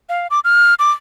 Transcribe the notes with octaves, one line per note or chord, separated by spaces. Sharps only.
F5
D6
F6
D6